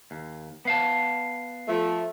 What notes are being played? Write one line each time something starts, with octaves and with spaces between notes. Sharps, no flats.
D#2
B3 F5 A5
F3 A3